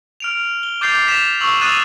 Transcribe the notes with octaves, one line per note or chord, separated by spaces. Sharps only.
F6 D7 F7
G7
D6 G6 A6 C7 F7 G7
B6 E7 F7
C#6 E6 F#7
D#6 E6 F#6 A6 D#7 F7